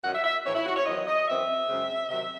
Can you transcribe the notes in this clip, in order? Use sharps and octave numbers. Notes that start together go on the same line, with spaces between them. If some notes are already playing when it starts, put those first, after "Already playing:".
F#2 D#3 F#3 C#4 F#5
E5
E5
A2 E3 C4 C#5
E4
F#4
C#5
E2 D#3 F#3 C4 D#5
D#5
F#2 E3 C4 E5
F#2 C#3 G#3 C4
C3 D#3 F#3 E5